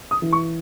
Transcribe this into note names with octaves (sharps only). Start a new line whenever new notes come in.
D#6
E3
C#6